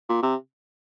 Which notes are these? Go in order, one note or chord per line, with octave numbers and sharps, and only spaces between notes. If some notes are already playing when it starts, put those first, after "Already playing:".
A#2
C3